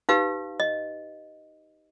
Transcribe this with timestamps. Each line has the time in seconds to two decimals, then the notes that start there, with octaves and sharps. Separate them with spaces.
0.09 D#4 G4 B4 F5
0.60 D#5